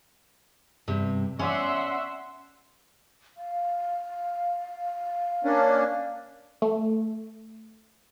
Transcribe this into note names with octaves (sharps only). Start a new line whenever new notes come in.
G2 C3
C#4 D5 E5 F#5 C6
F5
A#3 C#4 D4
A3